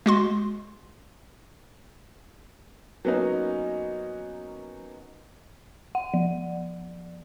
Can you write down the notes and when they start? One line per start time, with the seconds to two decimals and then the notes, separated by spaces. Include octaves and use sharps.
0.06 G#3 F#4 C6
3.05 F#3 A#3 B3 C#4 D#4
5.95 F#5
6.14 F3